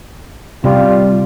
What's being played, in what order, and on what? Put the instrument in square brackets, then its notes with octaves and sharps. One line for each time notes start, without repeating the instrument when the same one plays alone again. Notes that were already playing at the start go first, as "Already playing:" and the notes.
[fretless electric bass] C3 [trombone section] G3 F4